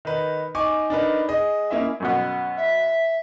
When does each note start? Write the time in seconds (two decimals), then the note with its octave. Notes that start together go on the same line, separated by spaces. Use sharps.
0.05 D#3 D#4 B4
0.55 D#4 G#5 C#6 D6
0.90 D4 D#4 A#4 B4
1.28 G#4 D#5
1.70 A#3 C#4 E4 D#5 E5
2.00 F#2 B2 B3
2.57 E5